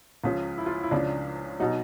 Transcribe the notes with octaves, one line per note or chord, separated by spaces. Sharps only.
C#2 C#3 F3
E4
F4
E4
C#2 C#3 F3 D4
B2 F#3 D#4